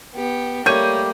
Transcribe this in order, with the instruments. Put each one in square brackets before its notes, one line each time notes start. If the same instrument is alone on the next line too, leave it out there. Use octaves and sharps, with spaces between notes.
[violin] B3 G4
[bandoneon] G3 A3 G4 [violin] A#3 [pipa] C#5 [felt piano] G6 D#7